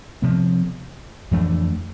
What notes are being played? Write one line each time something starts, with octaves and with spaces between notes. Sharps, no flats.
C3 F3 B3
F2 E3 A3 D4